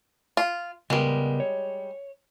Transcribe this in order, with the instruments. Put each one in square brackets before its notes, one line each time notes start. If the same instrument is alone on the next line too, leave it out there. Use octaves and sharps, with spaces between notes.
[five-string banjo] F4
[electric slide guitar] C#3 B3 A#4 [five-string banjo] G3 G#3
[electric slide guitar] C#5